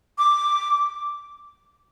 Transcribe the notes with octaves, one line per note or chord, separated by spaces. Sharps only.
D6